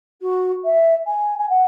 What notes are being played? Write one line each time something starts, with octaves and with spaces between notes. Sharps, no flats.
F#4
E5
G#5
G#5
F#5